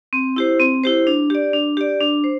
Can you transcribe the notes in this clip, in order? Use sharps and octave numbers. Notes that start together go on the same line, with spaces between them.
C4
E4 G4 C5
C4
E4 G4 C5
D4
G4 D5
D4
G4 D5
D4
C5